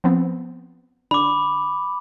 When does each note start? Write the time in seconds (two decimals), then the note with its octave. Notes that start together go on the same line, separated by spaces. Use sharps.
0.04 F3 B3 C4
1.11 D3 B5 D6